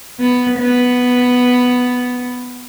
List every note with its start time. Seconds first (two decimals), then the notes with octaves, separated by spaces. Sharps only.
0.20 B3
0.59 B3